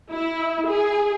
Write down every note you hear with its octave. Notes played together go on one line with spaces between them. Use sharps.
E4
G#4